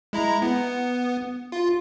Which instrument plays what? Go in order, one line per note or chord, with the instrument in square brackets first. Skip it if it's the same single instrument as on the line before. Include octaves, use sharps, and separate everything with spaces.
[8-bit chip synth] G#3 E4 A#5
B3
F4